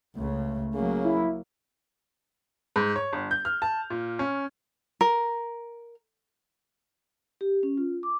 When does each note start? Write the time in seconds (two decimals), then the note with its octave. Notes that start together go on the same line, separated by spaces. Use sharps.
0.16 C#2 C#3 A3
0.74 C#3 F#3 A#3
1.05 E4
2.76 G#2
2.96 C#5
3.13 G1
3.31 G6
3.45 F6
3.62 A5
3.90 A#2
4.19 C#4
5.01 A#4
7.41 G4
7.63 C#4
7.78 F4
8.03 D6